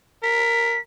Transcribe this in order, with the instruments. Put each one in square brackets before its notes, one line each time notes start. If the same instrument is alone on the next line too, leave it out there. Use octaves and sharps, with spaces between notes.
[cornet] A#4 [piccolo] B6